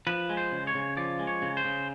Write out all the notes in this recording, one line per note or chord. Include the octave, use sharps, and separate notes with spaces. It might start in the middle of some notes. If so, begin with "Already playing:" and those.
F3 B4
G#3
C5
C#3
C#5
C#3
F3 D5
G#3
C#5
C#3
C5
C#3